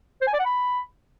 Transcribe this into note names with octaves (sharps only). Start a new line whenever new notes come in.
C5
G#5
D5
F#5
B5